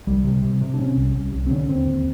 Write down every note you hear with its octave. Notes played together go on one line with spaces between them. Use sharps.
C2 G3
C3
C3
C3
D4
C3 C#4
C2
C2
C2
C4
D3 C#4
D#2 C4
D#2